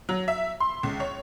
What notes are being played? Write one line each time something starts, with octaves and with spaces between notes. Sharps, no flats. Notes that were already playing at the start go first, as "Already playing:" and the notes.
F#3
E5
C6
C#2
C#5